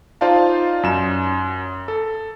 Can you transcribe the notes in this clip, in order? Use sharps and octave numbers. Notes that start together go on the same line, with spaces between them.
D#4 F4 C5 D5 F5 A5
F#2 E7
A4